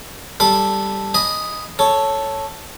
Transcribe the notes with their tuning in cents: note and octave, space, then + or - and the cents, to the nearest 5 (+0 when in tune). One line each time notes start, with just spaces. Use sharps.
G3 +0 A4 +0 B5 +0
D#5 +0 G#5 +0 B5 +0
A4 +0 C#5 +0